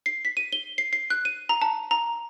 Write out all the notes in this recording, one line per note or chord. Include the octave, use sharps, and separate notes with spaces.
C7
B6
D#7
G7
C7
C7
F#6
D#7
A#5
A5
A#5